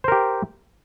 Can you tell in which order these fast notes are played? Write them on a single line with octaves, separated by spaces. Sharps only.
C5 A#4 G4